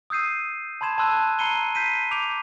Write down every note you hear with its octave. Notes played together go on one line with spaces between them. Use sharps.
D#6 E6 G6 C7 D#7
A5 B5 C6 G#6 E7
A5 B5 C6 E6 F#6 D#7
A#5 B5 C7 C#7 D#7 G7
G6 B6 C7 D#7
D6 G6 D7 F7